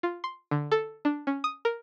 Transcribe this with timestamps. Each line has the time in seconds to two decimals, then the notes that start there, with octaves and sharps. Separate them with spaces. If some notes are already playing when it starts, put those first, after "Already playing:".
0.03 F4
0.24 C6
0.51 D3
0.72 A4
1.05 D4
1.27 C#4
1.44 D#6
1.65 A#4